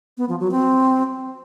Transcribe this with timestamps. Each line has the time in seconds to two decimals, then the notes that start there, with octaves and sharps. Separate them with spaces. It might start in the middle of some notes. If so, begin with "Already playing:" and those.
0.18 B3
0.29 F3
0.40 F#3
0.51 C4